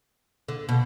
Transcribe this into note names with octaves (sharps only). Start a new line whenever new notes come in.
D3
B2